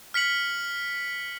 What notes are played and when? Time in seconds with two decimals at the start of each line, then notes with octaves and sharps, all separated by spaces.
0.14 F6 B6 C#7 F#7